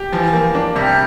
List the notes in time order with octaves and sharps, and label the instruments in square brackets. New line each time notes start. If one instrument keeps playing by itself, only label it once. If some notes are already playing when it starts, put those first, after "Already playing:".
Already playing: [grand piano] G4
[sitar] E3 [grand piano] F3
[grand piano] A#3
D4
[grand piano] C3 [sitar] G3